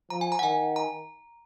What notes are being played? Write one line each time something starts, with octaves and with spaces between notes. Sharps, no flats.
F3 A#5
G#5
A#5
F#5
D#3 G#5
A#5